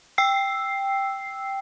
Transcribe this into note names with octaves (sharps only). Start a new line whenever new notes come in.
G5 E6 C7